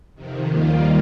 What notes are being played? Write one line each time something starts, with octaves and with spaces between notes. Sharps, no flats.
F2 C3 D#3
D#2 D#3 G3 A#3 F4